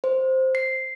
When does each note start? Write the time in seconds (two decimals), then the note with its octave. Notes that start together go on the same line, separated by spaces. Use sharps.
0.04 C5
0.55 C7